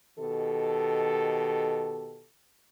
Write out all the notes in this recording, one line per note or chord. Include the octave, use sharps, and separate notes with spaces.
B2 D#3 G4 A4